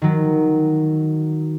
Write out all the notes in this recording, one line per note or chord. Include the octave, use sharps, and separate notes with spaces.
D#3 F#3